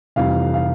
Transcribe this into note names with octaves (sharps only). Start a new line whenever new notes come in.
F1 F2 E3 G3 F5
F5